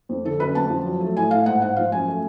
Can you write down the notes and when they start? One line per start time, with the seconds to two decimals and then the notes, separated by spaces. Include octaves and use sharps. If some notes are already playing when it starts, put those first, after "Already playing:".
0.09 F2
0.25 D3 A4
0.40 F#2 B4
0.55 F2 A5
0.70 F3
0.86 F#3
1.00 A3
1.16 A2 G#5
1.31 A2 F5
1.46 G#2 F#5
1.62 G#2 F#5
1.76 F3 F5
1.92 F#2 G#5
2.08 A3